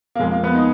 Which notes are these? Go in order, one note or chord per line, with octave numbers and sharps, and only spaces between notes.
A#3
F2 G#3
A#3
F3 B3
D#4